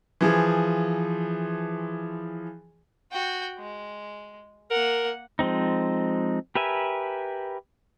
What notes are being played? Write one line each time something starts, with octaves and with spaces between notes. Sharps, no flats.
E3 F3 G#4
F#4 G5
G#3
A#3 A#4 F#5
F3 G#3 C4 D#4
G4 A#4 B4 E5 G#5